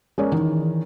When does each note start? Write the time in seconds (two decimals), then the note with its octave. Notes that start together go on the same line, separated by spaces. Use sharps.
0.18 G#3 C#4 A#4 C#5 D5
0.32 D#3 E3